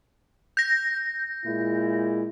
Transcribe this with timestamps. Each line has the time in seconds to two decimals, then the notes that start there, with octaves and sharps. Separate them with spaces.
0.57 G6 A#6
1.46 A#2 G#3 E4